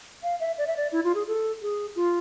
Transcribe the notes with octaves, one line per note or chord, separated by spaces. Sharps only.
F5
E5
D5
E5
D5
E4
F4
G#4
A4
G#4
F4